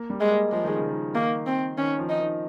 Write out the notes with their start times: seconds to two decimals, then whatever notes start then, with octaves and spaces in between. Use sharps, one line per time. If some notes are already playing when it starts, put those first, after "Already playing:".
Already playing: A#3
0.10 G3
0.20 G#3
0.31 A#3
0.52 F3 G#3
0.64 D#3
0.76 C#3
0.88 D#3
1.15 D#3 A#3
1.46 C4
1.78 D#3 C#4
1.99 F3
2.09 D#4
2.20 D#3